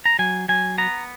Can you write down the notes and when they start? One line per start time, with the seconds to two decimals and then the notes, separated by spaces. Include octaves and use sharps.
0.06 A#5
0.19 F#3 G#5
0.49 F#3 G#5
0.78 B3 A#5